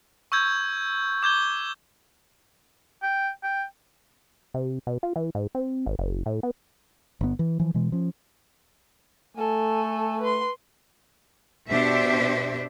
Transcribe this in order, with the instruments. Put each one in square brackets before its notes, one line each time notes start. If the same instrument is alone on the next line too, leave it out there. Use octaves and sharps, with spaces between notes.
[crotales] C#6 E6 G6 G#6
D6 G6 G#6 G7
[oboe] G5
G5
[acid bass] C3
B2
F4
E3
G#2
C4
G#1
F#1
A2
B3
[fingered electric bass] G1 B3
E3
E3 F3
B2 E3 G#3
F3 C#4
[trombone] A3 [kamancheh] A4 G#5
[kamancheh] B4 C6
[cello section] B2 D4 G4 C5 E5